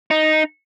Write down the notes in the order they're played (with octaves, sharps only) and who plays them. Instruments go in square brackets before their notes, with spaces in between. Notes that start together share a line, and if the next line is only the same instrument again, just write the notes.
[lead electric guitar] D#4